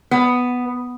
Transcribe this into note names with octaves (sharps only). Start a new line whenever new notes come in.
B3